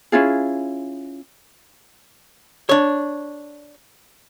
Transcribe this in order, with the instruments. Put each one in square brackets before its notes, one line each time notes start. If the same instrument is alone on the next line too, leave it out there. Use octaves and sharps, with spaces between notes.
[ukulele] C#4 E4 F4 G#4
[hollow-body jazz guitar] D4 C#5